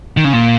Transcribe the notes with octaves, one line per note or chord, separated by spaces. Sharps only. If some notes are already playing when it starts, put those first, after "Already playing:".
D#3
C#3
A#2